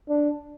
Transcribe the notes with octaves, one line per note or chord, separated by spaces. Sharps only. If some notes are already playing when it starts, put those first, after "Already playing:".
D4